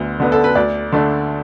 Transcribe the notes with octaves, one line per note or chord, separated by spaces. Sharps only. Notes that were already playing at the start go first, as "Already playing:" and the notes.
Already playing: D2 D3 B3
D3 B3 D4
A4
B4
D2 D5
D3 A3 D4